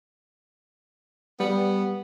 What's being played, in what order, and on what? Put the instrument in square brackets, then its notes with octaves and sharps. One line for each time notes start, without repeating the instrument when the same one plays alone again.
[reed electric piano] G3 [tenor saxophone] B3